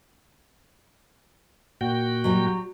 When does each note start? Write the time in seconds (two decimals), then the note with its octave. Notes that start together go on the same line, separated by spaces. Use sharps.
1.81 A#2 F#4 G5
2.24 F#3 G3